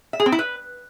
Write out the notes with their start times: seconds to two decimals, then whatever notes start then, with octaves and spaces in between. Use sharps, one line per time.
0.13 E5
0.20 G#4
0.26 C4
0.32 E4
0.39 B4